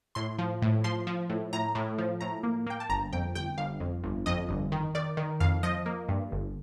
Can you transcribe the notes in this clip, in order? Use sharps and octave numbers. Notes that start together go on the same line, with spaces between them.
A2 C6
F3
A2
F3 C6
F3
A2
A2 A#5
A2
F3
A2 A#5
A#3
A#3 G5
A5
G1 A#5
F2 G5
G1 G5
G1 F5
F2
G1
F2 D#5
G1
D#3
D#3 D5
D#3
F2 F5
F3 D#5
A#3
G2
G1